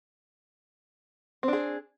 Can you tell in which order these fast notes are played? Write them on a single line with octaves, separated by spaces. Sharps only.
C4 D4 G#4